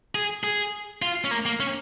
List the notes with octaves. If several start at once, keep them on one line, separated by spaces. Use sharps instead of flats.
G#4
G#4
F4
C#4
A#3
A#3
C#4